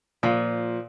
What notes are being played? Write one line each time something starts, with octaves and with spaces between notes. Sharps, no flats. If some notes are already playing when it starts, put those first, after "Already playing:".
A#2 F3